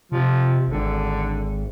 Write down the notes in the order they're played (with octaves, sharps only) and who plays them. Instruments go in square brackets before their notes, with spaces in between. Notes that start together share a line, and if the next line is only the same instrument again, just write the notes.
[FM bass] C3 [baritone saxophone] F3
[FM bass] G#1 [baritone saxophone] D3